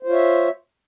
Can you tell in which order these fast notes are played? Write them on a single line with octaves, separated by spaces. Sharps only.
C5 F4 C#5 E5